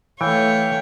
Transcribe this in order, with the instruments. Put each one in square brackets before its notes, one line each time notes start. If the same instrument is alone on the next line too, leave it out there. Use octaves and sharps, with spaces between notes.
[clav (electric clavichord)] E3 [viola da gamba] A3 C#5 [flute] F5 [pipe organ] G5